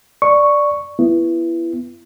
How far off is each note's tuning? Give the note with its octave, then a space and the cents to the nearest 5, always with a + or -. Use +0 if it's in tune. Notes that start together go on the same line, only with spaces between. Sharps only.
D5 +0 C#6 +0
B3 +0 E4 +25